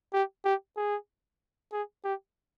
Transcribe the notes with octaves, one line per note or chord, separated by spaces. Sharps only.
G4
G4
G#4
G#4
G4